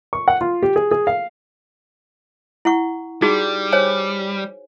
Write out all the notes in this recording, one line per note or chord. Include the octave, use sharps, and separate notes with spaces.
C#6
F#5
F4
G4
G#4
G#4
F5
E4 F#5 C#6
G3 D#4 F#4 G#4
C5 C#5 G#5